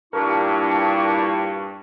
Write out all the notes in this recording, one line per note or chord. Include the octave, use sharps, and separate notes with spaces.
G2 A#2 D4 E4 A#4 C#6